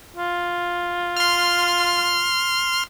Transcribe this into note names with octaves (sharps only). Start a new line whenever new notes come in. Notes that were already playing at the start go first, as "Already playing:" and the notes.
F4
C6 F6